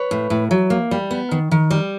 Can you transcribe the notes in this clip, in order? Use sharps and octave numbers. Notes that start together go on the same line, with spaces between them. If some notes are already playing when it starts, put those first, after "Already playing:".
Already playing: B4 C#5
A2
A2
F#3
A#3
G3
B3
D#3
D#3
G3